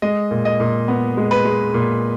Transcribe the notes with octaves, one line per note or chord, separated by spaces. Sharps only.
G#3 D#5
A#2
D#5
A#2
B3
G#3
B4
G#3
A#2